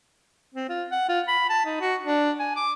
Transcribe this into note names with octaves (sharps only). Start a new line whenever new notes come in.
C4
F4
F#5
F4
B5
A5
D#4
F#4
D4
G#5
D6